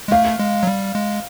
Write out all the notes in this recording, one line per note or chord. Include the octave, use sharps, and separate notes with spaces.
G#3
A3 F5
G#3
F#3
G3
G#3